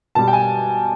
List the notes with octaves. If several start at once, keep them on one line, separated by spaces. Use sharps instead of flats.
B2 G3 A5
G5
G#5